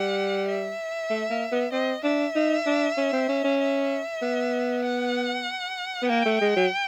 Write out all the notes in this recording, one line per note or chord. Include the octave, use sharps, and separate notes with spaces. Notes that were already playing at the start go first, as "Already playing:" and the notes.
Already playing: G3 F#5
E5
A3
A#3
B3
C4 D#5
D4 E5
D#4
D4
C#4
C4
C#4
C#4
E5
B3
F#5
B3
A#3 G5
A3
G#3
F#3